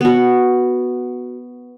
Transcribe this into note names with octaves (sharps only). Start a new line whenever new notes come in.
B3 F#4